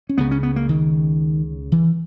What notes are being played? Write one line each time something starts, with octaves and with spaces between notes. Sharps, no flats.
C#4
C#2 C#3 B3
C#4
B3
A#3
D#3
E3